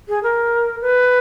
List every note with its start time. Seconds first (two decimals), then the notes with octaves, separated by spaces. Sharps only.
0.09 G#4
0.23 A#4
0.81 B4